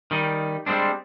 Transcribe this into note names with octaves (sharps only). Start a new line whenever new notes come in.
D#3 G3 D#4
G3 G#3 A#3 C4 D4